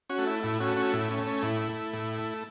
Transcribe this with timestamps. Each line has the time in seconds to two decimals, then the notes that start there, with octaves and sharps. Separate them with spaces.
0.10 C#4 F#4
0.18 A3
0.27 E4
0.43 A2 E4
0.60 C#4 F#4
0.69 A3
0.76 C#4 F#4
0.94 A2 E4
1.10 C#4
1.18 A3
1.27 C#4
1.43 A2 E4
1.69 A3
1.93 A2
2.18 A3